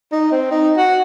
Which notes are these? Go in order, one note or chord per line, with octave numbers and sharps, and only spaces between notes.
D#4
C4
D#4
F#4